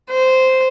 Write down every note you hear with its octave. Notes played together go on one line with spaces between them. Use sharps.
C5